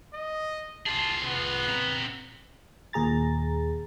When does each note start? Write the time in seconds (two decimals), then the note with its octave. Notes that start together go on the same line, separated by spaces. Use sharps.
0.14 D#5
0.86 F4 G#4 A5
1.24 B3
1.69 C4 A#5
2.93 D#2 A#2 G#4 A#5 A6